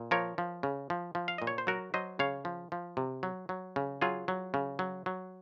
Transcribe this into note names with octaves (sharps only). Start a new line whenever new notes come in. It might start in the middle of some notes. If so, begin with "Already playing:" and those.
Already playing: A#2
F3 A#4 C#5
F3
C#3
F3
F3
F5
A#2 D#5
C#5
C5
F#3 F#4 A#4
F#3 C5 D#5
C#3 C#5 F5
F3
F3
C3
F#3
F#3
C#3
F#3 F4 G#4
F#3
C#3
F#3
F#3